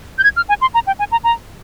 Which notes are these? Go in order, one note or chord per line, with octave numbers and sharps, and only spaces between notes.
G6
G#6
F6
G#5
C6
A#5
G5
G#5
A#5
A#5